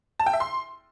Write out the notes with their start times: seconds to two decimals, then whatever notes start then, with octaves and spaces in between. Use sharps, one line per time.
0.20 A5
0.26 G5
0.33 E5
0.40 C6